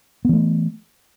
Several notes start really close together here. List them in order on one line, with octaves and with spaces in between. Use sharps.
B3 E3 A3